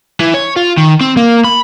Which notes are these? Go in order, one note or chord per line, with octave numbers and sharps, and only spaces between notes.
E3
C#5
F4
D#3
C4
A#3
B5